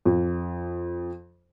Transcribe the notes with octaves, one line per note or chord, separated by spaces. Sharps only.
F2